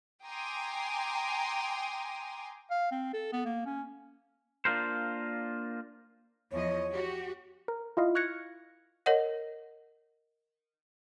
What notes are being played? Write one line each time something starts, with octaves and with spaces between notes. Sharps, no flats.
G5 G#5 A#5 C6 D6 D#6
F5
C4
A4
B3
A#3
C#4
A#3 D4 F4 A#4 C5
E2 F3 C#5 D#5
F#4 G4
A#4
E4 F4 D#5 F5
C#6 F6 F#6 G#6 A#6 C#7
A#4 C#5 D#5 F#5